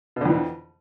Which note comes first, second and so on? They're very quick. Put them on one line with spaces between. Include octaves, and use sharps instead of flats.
B2 D3 F2 E3